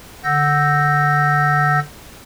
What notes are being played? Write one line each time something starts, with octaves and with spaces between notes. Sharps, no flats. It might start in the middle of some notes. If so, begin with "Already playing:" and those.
D3 F#5 E6 G6 A#6